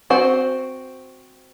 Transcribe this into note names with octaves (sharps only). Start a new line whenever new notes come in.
C4 F#4 C5 F#5